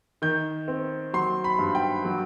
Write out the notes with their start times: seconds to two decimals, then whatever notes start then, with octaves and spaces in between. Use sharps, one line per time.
0.22 D#3 G6
0.68 C4
1.13 F#3 C6
1.44 B5
1.59 G2
1.75 G5
2.05 F#3